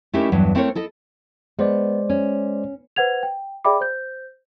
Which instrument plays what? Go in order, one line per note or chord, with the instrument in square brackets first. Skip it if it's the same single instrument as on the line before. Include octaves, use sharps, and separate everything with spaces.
[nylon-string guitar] A3 C#4 D#4 E4 G4 A#4
E2 G2 F#3
A3 C4 E4 A#4 C5 C#5
E4 A4 D#5
[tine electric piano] G#3 C5 D5 [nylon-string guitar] B3
[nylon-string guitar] C#4
[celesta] B4 C5 F#5 G#6 F7
G5
G#4 D5 E5 G5 B5 D6
C5 G6